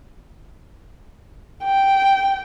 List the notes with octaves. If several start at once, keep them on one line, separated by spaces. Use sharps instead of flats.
G5